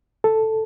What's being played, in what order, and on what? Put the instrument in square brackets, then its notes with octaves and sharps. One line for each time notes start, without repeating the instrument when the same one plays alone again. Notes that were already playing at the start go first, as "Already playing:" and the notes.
[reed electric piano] A4